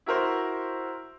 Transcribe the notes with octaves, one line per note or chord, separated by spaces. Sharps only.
E4 F#4 A#4 C5